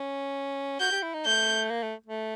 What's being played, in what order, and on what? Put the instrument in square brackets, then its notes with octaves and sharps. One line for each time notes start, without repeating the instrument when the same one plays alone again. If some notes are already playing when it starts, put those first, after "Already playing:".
Already playing: [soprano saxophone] C#4
[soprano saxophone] F#4 [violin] G6
[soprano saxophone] G4
E4
D#4
[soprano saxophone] A3 [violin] G6
[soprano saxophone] A#3
A3
A3